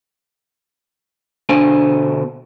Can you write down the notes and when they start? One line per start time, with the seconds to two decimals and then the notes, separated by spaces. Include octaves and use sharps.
1.49 B2 D3 D4 C5 G#5